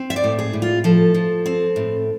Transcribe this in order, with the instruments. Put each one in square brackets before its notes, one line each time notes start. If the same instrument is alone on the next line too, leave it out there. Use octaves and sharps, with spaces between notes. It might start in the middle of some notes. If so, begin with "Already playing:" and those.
Already playing: [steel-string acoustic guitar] C4
E5
D5
A2
G#4
A2
F4
F3 A4
F3
C4
A2